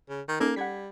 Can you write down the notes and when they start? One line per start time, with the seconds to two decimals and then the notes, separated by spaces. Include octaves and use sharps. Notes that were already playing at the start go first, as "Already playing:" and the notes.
0.09 C#3
0.28 D#3
0.40 A#3 C#4 D#4 A4
0.56 G3 F#5 G#6 B6